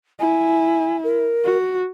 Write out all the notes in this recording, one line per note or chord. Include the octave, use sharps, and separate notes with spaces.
E4 G#5
A#4
F#4